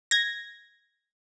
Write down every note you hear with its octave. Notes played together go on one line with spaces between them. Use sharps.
G#6 A#6